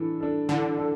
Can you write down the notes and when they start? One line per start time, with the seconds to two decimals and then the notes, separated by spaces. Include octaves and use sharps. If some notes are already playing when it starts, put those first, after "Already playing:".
Already playing: E3 D4 A4
0.20 D4 A4
0.49 D3 E3
0.77 D4 A4